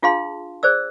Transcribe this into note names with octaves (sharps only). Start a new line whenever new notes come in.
D4 F4 G#4 F5 A5 C6
G#4 C5 D5 E6